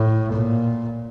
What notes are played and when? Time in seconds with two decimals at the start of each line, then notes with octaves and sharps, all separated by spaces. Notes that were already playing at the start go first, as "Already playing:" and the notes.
Already playing: A2
0.32 A#2